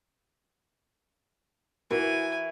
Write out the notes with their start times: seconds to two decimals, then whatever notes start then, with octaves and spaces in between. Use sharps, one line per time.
1.91 E3 E4 F#4 A#4 G#5